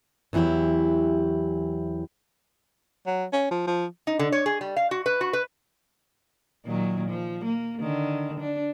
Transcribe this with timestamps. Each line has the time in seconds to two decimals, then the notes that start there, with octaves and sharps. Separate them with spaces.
0.33 E2 E3 F#3 E4 G4
3.07 F#3
3.33 C#4
3.51 F3
3.67 F3
4.07 D#4
4.19 D3
4.32 C#5
4.46 G#4
4.61 G3
4.77 F5
4.91 F#4
5.06 B4
5.21 F#4
5.33 B4
6.66 A#2 D#3 F#3
7.09 F3
7.45 A#3
7.80 D3 D#3
8.40 D4